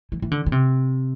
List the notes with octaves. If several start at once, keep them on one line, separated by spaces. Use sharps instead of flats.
E3
E3
D3
D3
C3